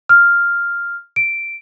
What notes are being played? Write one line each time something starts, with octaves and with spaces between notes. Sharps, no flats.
F6
D7